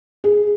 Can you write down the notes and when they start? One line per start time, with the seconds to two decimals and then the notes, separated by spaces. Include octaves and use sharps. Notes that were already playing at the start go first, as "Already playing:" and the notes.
0.24 G#4